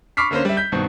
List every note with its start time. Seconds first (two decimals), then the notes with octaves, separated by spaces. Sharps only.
0.17 B5 C#6 D6 F6 B6 C7
0.31 D3 A#3 C#4 A#4 C5
0.45 G3 E5
0.57 G6 B6
0.72 G2 B2 D#3 C4